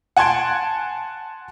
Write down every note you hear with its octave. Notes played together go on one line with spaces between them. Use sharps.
F#5 G#5 A5 C6 G#6 D7